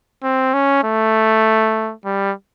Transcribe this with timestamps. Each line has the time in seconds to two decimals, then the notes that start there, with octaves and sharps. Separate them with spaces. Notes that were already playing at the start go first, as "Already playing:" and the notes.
0.23 C4
0.54 C#4
0.84 A3
2.05 G3